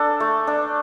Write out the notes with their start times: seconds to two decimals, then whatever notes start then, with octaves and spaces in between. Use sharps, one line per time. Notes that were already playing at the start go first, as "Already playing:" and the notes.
Already playing: D4 A4
0.20 A3
0.47 D4